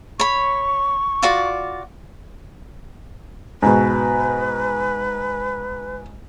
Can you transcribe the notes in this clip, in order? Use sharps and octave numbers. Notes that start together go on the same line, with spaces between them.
C#5 B5 C#6
F4 F#4 D5
G#2 B2 B4